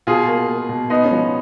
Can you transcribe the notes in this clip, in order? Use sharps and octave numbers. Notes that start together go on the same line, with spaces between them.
B2 F4 G#4
A#3
A#3
B2
B3 D#4
C#4
F3